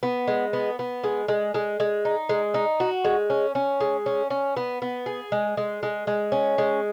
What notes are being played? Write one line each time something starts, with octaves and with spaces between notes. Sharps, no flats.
B3
G#3
B3
B3
G#3
G#3
G#3
G#3
D#4
G#3
D#4
F#4
G#3
C#4
C#4
G#3
C#4
C#4
B3
B3
G#4
G#3
G#3
G#3
G#3
C#4
G#3